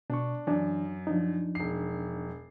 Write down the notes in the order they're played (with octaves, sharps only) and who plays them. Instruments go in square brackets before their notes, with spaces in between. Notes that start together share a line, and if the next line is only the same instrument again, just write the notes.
[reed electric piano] B2 C#6 [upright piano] D4
[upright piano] F#2 [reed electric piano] E3 D4
[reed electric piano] F3 D4 D#4
[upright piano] E1 C7